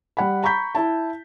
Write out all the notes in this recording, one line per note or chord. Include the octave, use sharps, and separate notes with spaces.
G3 F#5 B5
A#5 B5 C#6 G6 B6
E4 A5